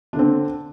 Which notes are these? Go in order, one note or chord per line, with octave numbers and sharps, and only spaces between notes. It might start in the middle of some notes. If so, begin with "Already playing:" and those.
D3 C4 D4